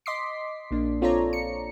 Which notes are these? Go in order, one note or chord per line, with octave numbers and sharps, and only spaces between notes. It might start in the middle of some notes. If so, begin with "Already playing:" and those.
D#5 C6 D6 B6 C7
A#1 A#3 D4
C4 F4 A4 C#5 D5 A#5
C#7